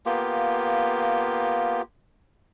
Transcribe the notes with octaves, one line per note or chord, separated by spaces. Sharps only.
A#3 B3 F4 G4